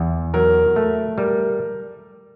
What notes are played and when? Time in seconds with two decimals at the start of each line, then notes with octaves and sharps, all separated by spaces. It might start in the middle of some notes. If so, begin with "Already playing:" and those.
Already playing: E2
0.34 F#3 A#4
0.76 A3
1.18 G3 A#4